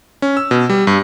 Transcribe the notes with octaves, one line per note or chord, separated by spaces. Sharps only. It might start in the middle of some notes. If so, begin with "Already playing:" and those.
C#4
E6
B2
G3
G2